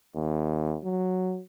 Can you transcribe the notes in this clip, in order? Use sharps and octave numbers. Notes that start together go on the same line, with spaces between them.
D#2
F#3